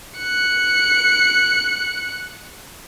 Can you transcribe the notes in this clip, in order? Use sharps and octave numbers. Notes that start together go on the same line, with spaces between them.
F#6 C#7